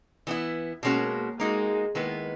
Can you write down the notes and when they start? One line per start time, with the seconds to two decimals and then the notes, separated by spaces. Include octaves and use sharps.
0.27 E3 B3 E4
0.83 B2 G#3 A#3 C#4 F#4
1.39 G#3 A#3 D#4 F#4
1.95 D#3 G#3 A#3 B3 E4 B4